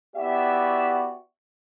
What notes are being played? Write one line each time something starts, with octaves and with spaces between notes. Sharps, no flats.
B3 E4 F#4 G4 D5 E5